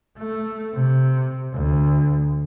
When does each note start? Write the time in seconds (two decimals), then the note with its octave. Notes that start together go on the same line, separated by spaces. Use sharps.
0.18 A3
0.74 C3
1.53 D2